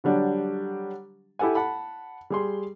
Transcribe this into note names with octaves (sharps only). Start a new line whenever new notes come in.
D3 F#3 G3 D4
E4 G4 A4 F#5 G#5
F#5 A5 B5
G3 G#4 C6